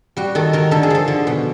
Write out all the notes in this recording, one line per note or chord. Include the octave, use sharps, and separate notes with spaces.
G3 F#4
D#3 A4
D#3 A#4
D3 A4
G#4
F3 A4
D3
B2